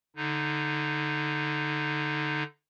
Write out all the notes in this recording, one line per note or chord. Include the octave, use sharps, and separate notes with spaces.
D3 D#4